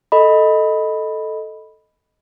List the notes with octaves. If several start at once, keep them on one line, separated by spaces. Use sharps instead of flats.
A4 D#5 B5